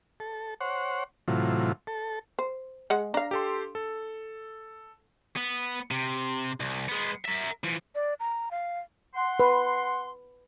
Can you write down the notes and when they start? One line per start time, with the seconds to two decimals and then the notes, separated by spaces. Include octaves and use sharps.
0.20 A4
0.60 C5 C#5 F#5
1.28 A2 C3 E3 F#3 F4
1.87 A4
2.39 C5
2.90 G#3 F#5
3.14 D4 F5 A#5
3.31 G4 A4 C6
3.75 A4
5.36 B3
5.91 C3
6.60 C2
6.88 G#3 B3
7.25 A#4 E5
7.64 E3 F3
7.95 D5
8.20 A#5
8.51 F5
9.15 F#5 C6
9.40 B4